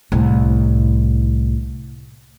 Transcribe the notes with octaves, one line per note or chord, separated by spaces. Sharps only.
C2 A2